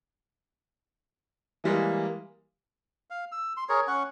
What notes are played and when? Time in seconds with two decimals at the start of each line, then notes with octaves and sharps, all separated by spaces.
1.64 E3 G3 G#3 A#3
3.10 F5
3.32 E6
3.57 C6
3.69 G#4 A#4 C#5
3.88 C#4 F#5 C#6